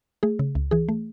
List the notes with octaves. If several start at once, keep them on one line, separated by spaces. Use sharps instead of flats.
A3 G#4
C#3
C#2
E3 G#4
A3